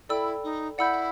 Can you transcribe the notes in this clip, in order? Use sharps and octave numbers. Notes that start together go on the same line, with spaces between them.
E4 A4 D5 G5 B5 E6
D#4
E4 D5 F#5 B5 E6 G6